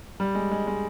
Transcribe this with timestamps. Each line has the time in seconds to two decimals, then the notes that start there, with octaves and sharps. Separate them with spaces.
0.20 G3
0.35 G#3
0.51 G#3
0.67 G#3